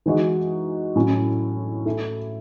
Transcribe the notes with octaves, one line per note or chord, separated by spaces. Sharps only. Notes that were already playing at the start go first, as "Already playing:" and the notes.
E3 G#3 D#4 F#4
A2 F#3 C#4
A3 E4 A4